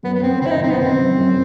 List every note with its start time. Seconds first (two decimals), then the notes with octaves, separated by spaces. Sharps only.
0.03 F#2 B3
0.14 B3
0.22 F#2 C4
0.41 F#1 C4 E4
0.51 D#4
0.60 F#1 C4
0.70 B3
0.79 F#1 C4
0.98 F#2
1.18 F#2